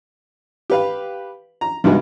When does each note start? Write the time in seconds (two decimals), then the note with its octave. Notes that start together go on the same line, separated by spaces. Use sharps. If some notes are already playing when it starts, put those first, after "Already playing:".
0.70 G4 B4 F5
1.61 A#5
1.84 G2 C3 D#3 G#3 B3 F#4